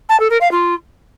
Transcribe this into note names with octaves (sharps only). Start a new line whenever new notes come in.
A5
A4
A#4
F5
F4